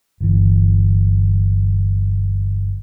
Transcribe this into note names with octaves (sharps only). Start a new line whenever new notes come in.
G1 E3